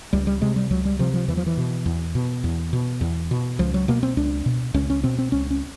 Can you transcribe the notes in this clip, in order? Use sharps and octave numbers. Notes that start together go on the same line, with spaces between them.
C#2 G3
G3
C3 G#3
G3
C#2 F#3
G3
C3 F3
F3
E2 E3
F3
E3
B2
E2
B2
E2
B2
E2
B2
C#2 F3
F#3
B2 A#3
C4
C#2 D4
B2
C#2 C#4
C#4
B2 C4
C4
C#2 C#4
C#4